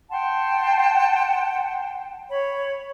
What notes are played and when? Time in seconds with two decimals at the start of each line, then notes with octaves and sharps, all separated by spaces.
0.11 F#5 G5 A5 C6
2.30 C#5 B5